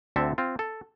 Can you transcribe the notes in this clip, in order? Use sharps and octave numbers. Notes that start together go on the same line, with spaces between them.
D2 D3 C4 A4 E5
C4 F4
A4